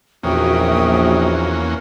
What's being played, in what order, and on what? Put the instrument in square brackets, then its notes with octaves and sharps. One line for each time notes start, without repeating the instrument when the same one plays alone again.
[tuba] A#1 [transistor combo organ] E2 A#3 C#4 [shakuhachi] F#4 [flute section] E5 G5 D#6